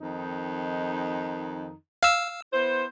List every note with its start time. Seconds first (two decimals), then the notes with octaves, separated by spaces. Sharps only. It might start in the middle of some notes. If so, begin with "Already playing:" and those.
0.01 F2 D#3 D#4
2.03 F5 E6
2.53 B3 E4 C5